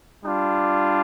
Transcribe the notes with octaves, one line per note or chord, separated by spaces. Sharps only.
G3 D4 F4